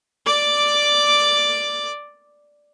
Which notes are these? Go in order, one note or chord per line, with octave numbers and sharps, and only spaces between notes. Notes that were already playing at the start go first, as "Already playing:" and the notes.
D5 D6